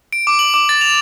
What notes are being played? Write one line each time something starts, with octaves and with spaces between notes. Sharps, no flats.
D7
D6
F#7
D6
A6
F7